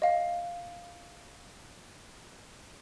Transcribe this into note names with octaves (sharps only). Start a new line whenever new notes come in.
D#5 F5